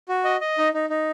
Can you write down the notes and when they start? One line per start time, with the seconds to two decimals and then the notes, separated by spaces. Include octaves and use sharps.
0.09 F#4
0.25 D#5
0.41 D#5
0.58 D#4
0.74 D#4
0.90 D#4